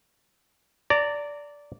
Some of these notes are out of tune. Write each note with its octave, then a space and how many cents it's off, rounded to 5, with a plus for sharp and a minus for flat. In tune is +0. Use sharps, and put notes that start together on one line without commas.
D5 -15 A#5 -35